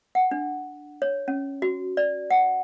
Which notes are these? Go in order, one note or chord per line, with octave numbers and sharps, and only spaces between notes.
F#5
D4
C#5
C#4
F#4
D5
F#5